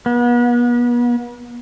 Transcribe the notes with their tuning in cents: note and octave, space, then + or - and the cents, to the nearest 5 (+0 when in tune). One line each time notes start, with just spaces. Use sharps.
B3 -35